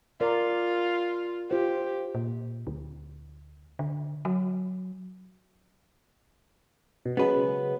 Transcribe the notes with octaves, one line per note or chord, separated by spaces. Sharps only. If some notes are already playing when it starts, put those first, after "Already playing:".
F4 A#4 D5
F4 G4 C5
A#2
D2
D3
F#3
B2
C#3 F#3 G#3 B3 B4